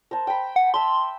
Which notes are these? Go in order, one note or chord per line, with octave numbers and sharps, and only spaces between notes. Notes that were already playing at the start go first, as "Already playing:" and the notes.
A#4 C5 A5
G5 B5
F#5
E5 A5 C6